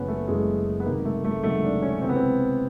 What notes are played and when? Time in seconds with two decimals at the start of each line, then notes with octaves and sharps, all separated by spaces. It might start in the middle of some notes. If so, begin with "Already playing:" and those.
Already playing: F#1 F#2 C#3 E3 B3 C#4
0.08 A3
0.28 F#1 F#2 C#3 E3 G#3
0.80 B3
0.85 C#2 C3 D#3 F#3 A#3
1.05 A3
1.25 A3
1.43 C#2 C3 D#3 F#3 A3
1.63 D4
1.82 C#4
2.02 C#2 C3 E3 C4
2.09 B3
2.16 C4